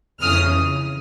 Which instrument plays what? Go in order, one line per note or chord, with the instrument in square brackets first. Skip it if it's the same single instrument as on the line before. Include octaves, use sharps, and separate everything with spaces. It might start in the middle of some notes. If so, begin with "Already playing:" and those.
[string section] F2 C#3 E3 D#6 F6